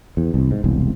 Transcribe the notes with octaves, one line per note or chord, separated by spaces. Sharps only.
E2
C2
G#2
E1 C2